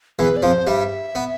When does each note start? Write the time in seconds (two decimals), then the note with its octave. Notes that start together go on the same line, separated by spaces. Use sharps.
0.19 E2 E3 B4
0.37 D5
0.42 F2 F3 C5
0.67 G2 G3 E5
1.15 B3